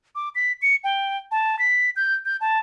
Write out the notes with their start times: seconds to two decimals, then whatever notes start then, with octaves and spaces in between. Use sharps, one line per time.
0.15 D6
0.35 B6
0.62 C#7
0.84 G5
1.31 A5
1.59 B6
1.96 G6
2.25 G6
2.41 A5